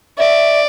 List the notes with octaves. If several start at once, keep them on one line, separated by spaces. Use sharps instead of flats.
D5 E5